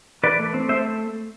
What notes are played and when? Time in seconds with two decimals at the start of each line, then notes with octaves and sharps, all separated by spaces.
0.23 E3 B4 D5
0.39 A3
0.54 C4
0.69 A3 C5 E5